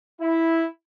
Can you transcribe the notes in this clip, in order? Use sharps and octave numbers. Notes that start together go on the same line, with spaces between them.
E4